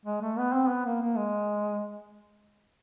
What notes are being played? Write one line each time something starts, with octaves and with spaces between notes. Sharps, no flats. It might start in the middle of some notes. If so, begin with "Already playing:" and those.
G#3
A3
B3
C4
B3
A#3
A#3
G#3